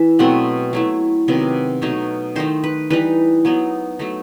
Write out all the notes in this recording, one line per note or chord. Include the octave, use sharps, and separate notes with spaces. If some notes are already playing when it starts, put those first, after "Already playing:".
Already playing: E3 E5
B2 F#3 A3 C4 F#5
F#3 A3 E4
C3 D#3 F#3 B3
B2 F#3 A3 D#4
D#3 A3 D#4 C5
B4
E3 G3 D#4 B4
F#3 B3 D#4
F#3 A3 D#4